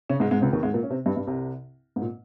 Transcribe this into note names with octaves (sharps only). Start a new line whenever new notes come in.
C#3 C#4
G#2 G#3
G#2 G#3
C#2 C#3
D#2 D#3
G#2 G#3
A#2 A#3
C#4
C3 C4
G2 G3
G2 G3
C2 C3
G#2
A#2